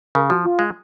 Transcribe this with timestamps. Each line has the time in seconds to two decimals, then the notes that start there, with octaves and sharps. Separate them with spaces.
0.15 C#3 A#4
0.29 F3 F#4
0.44 F4
0.59 G#3